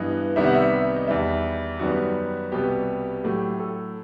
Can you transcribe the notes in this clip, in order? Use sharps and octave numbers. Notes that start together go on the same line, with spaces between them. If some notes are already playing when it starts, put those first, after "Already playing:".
Already playing: G2 E3 B3 D#5
C2 C3 D#3 G3 B3 E5
F#5
E5
D#5
E2 D#3 G3 E5
F#2 D#3 G3 B3 F#4
C2 B2 G3 B3 G4
A2 F#3 A3 G4
A4